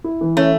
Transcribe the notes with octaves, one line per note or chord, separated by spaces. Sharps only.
E4
E3
A3 C#4